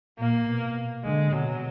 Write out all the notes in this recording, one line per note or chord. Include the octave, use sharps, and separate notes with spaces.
A#2 A#3
B2
D3 G#3
B2 F#3